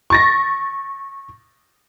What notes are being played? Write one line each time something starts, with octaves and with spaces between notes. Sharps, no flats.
C#6 A6 A#6